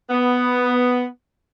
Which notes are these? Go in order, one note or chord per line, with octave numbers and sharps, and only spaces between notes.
B3